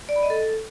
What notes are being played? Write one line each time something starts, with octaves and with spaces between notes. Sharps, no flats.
D5
B5
D#5
A4